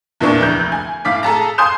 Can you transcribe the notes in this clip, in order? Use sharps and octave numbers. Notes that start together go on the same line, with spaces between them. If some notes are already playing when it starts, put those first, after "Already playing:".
E2 A#2 E3 A#3 D4 C#6
F1 D2 G6
G#5
A2 F5 D6 B6
G#4 A4 A5 A#5
F5 G#5 C6 D#6 G6 E7